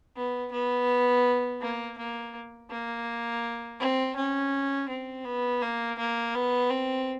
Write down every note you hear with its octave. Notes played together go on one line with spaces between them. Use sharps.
B3
B3
A#3
A#3
A#3
C4
C#4
C4
B3
A#3
A#3
B3
C4